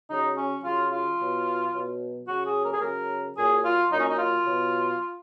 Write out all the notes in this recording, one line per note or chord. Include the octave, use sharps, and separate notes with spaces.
C#3 F#3 D#4
C#4
C#3 F#3 F4
F4
B2 F#3
B2 F#3
C#3 F#3 F#4
G#4
A#4
G#4
C#3 F#3 A#4
A#2 F#3 G#4
F4
A#2 F#3 D#4
C#4
D#4
F4
B2 F#3